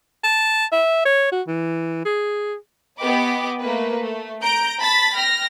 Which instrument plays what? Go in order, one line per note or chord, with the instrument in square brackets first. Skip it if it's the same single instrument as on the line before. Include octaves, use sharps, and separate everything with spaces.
[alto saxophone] A5
E5
C#5
F#4
E3
G#4
[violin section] B3 G4 D#5 B5 D6
A3 A#3 B4
A3
A#5 G6 D7
A5 B5 A6 B6
G5 F6 A#6